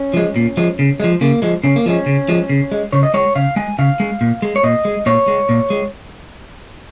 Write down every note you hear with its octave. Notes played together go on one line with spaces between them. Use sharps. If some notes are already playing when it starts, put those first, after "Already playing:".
Already playing: C#4
F3 G#3
A#2
F3 G#3
C#3
F3 G#3
C#3 A#3
F3 G#3
C#3 C#4
A#3
F3 G#3 C#4
C#3
F3 G#3
C#3
G#3
C#3 C#5
D#5
G#3 C#5
C#3 F5
G#3 G#5
C#3 F5
G#3
A#2
G#3
C#5
A#2 D#5
G#3
A#2 C#5
G#3
A#2
G#3